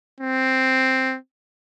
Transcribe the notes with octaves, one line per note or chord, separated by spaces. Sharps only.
C4